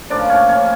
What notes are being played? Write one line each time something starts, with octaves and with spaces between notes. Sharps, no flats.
A2 F3 A#3 C#4 D4 D5
C#4 C#5
C#4 C#5